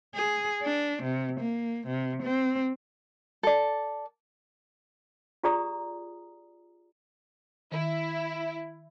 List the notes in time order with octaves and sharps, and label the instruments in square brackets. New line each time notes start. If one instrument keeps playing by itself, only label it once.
[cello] G#4
D4
C3
A#3
C3
C4
[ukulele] A4 D5
[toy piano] F4 G4 G#4 D5 A#5 D#6
[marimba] D#3 [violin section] E4